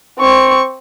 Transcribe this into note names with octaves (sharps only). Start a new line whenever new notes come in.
C4 C#6